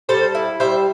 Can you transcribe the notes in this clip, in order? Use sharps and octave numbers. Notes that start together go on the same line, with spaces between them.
G3 A4 C5
E4
G3 C5 E5